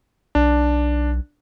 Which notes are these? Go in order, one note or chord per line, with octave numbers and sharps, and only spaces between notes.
B1 D4